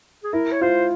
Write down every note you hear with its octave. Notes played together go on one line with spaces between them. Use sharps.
G#4
E4 A#4
C#5
F4 C5